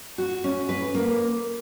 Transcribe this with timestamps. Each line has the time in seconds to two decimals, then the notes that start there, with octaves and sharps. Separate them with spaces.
0.18 F#4
0.44 C#4
0.69 B4
0.95 A#3